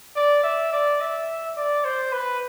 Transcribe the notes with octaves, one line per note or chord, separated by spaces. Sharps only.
D5
E5
D5
E5
D5
C5
B4